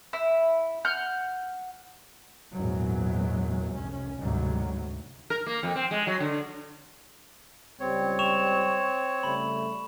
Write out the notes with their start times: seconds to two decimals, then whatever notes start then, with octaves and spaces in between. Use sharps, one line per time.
0.13 E4
0.85 F#5 F6 G6
2.53 A#1 E2 G#2 C#3 F#3
3.72 F1 C2 C#4
4.20 D2 G#2 C3 F#3 G3
5.30 A#4
5.47 A#3
5.63 F2
5.76 C4
5.91 G#3
6.07 F#3
6.20 D3
7.80 C#2 G3 C4 C#5
8.19 C#6 E7 F7
9.23 C#3 G3 A3 B5